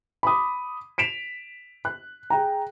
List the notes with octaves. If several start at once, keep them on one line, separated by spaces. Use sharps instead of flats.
B5 D6 D#6
B6 D7 E7 F7
F#6
G#4 G5 A#5